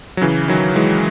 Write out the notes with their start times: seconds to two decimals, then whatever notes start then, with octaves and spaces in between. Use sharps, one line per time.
0.17 F#3
0.21 C#3 E3
0.48 D#3 F#3
0.76 E3 G#3